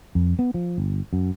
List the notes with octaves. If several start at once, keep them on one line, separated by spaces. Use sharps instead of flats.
F2
B3
F3
G1
F#2